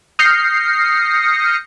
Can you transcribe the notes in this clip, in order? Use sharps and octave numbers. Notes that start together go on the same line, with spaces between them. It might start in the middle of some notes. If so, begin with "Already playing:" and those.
D#6 F6 G6 A#6 C7 C#7